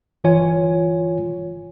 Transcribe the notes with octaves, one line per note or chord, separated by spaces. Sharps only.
G1 E3 F4 C#5 G#5